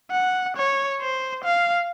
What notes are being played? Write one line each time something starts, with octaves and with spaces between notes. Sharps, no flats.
F#5
C#5
C5
F5